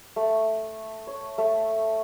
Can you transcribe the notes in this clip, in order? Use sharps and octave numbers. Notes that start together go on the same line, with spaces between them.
A3
C#5
A3